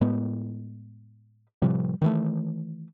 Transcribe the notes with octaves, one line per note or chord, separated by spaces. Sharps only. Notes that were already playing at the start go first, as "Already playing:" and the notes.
A2 G#3 B3
A2 C3 F3 G3
D#3 E3 A3